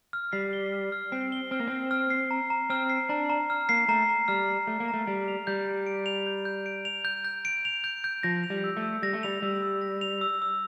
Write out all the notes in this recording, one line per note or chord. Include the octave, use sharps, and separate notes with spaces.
F6
G3 C7
G7
F6
F6
C4 C7
G7
C4 F6
A#3
C4 F6
F6
C7
A#5
A#5
C4 F6
C7
D4 A#5
A#5
F6
A#3 C7
A3 A#5
A#5
G3 F6
C7
A3 A#5
A#3
A#5
A3
G3 D7
F7
G3 G6
G6
D7
F7
G6
G6
D7
F7
G6
G6
D7
F7
G6
G6
F3 A#6
F7
G3
E6
A3
E6
G3 A#6
A3
G3 F7
G3 E6
E6
A#6
F7
E6
E6